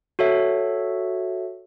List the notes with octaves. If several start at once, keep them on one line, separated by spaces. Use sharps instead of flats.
F#4 A4 C#5 E5